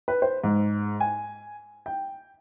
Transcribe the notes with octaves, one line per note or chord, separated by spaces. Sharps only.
B4
C5
G#2
G#5
G5